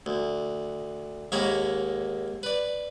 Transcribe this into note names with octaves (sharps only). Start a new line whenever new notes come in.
D2
D#2 G#2 A#3 C#5 A#5 B5
B4 D5